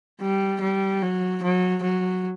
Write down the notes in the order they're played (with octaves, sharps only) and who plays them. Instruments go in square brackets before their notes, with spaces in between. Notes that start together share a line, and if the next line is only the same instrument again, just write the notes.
[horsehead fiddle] G3
G3
F#3
F#3
F#3